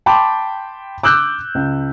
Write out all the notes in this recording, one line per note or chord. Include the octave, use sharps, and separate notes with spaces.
G5 A5 B5 C6 D6
D6 E6 F#6 G6
C#2